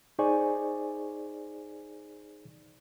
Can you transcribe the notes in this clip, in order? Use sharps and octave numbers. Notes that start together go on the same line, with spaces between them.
D#4 G#4 C5 D5 G#5 C#6